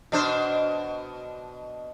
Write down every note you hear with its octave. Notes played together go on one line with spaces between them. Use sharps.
B2 D4 C5